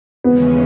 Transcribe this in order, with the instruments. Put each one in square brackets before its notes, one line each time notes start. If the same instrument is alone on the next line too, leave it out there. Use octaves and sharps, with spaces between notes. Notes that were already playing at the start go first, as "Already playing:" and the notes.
[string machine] D#2 C#3 E3 G#3 C#4 [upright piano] B3